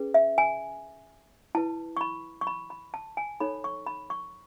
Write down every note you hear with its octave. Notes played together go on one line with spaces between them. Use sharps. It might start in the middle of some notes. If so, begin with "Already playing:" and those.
Already playing: C#4 G#4 B4
E5
G#5
E4 B4 A5
C#6
B5
C#6
B5
B5
A5
G#5
D#4 A4 C#5 B5
C#6
B5
C#6